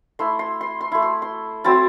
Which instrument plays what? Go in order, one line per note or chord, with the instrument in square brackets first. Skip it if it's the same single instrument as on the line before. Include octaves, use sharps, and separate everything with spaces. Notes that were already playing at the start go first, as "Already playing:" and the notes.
[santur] A3 E4 C6
C6
C6
C6
A3 E4
C6
C6
F#3 C4 E4 A5